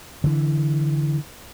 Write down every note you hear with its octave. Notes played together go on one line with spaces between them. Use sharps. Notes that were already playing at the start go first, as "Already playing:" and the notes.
D3 E3